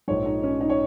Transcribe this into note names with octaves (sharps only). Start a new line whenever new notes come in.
A#1 G#2 F3 C#5
D#4
C#4
D#4
C#5